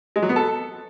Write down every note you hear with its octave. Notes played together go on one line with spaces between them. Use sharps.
G#3
F#3
B3
A4